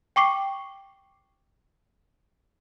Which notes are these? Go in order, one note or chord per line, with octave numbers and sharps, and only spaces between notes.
G5 C#6 D6 C7